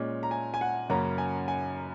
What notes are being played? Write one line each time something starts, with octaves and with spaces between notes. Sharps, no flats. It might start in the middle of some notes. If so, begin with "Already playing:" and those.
Already playing: A#2 G#3 C#4
A#5
G#5
G#5
F#5
F#2 C#3 A#3 C#4 A#5
G#5
G#5